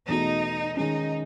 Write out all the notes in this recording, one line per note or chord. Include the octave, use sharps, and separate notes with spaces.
E2 B2 A3 D#4
D#3 G#3 C#4 D#4